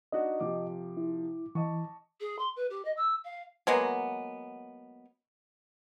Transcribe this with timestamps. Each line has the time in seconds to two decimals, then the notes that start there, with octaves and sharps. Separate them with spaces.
0.12 D4 D#4 F#4 D#5
0.40 C3 F3 D6
0.97 E4
1.55 E3 D#5 A5 C#6
2.20 G#4
2.38 C6
2.56 B4
2.70 G4
2.84 D#5
2.96 E6
3.24 F5
3.67 F#3 G#3 A#3 B3